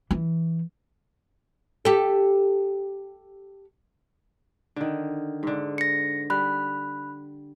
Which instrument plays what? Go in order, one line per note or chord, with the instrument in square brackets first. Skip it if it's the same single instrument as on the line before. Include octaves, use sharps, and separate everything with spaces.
[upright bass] E3
[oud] G4 A4
[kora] D3 D#3
G#2 D3
[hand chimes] A#6 C#7
[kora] G3 [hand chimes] B5 F#6